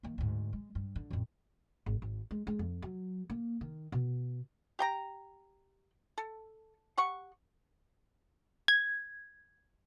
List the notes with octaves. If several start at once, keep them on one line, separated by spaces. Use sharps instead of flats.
D#3 A#3
D2 G#2
G#3
G2
D3
A1 F2
G#1
G#1
G#3
G#3
F2
F#3
A#3
D#3
B2
G4 G5 A#5
A4
G4 F#5 C#6
G#6